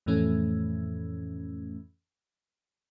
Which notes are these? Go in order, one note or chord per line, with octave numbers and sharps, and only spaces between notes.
F2 A2 E3 A3 C#4